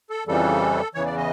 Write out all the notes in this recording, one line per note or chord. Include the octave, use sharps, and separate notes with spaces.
A4
F2 C#3 E3 G3 A4
E2 C#3 E3 C#5
D5
D#5